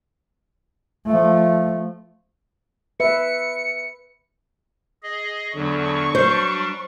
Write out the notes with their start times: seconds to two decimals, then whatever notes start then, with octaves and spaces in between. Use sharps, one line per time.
1.06 F3 A3
3.00 B4 E5 C#7
5.03 G#4 D#5
5.55 E2 D3 F#3 C#6
6.15 F#3 G3 D4 C5